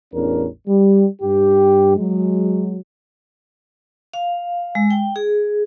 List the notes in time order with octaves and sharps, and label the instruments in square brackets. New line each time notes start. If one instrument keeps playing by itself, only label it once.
[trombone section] A1 E2 C#4 D4 A#4
G3
G2 G4
F#3 G#3
[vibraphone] F5
G#3
G5
G#4